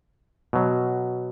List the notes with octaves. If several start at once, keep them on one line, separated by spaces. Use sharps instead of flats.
B2 F#3